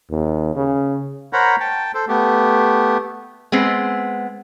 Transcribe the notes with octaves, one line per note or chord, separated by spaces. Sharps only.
D#2
C#3
A#4 C5 C#5 F#5 A#5 B5
G5 A5
A4 C5
A3 B3 G4
G#3 B3 C4